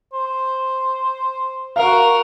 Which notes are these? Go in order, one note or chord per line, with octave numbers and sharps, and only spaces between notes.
C5
F#4 A#4 F5